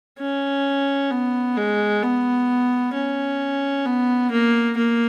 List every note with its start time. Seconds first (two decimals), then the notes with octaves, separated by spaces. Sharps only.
0.19 C#4
1.11 B3
1.57 G#3
2.02 B3
2.94 C#4
3.85 B3
4.31 A#3
4.77 A#3